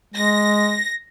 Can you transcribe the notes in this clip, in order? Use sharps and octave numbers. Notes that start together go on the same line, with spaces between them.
G#3 A#6